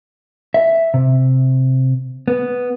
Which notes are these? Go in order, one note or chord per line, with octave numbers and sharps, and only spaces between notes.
E5
C3
B3